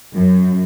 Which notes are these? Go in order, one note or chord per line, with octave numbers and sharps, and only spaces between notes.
F#2